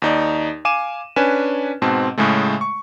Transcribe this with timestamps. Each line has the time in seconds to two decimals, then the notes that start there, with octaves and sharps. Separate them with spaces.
0.02 D#2 D#4 D5
0.65 F5 G#5 D6 D#7 E7
1.16 C#4 D4 B4 G#5 E7
1.82 G#2 B2 C4 A5
2.18 A2 C#3 G#3 A3
2.61 C#6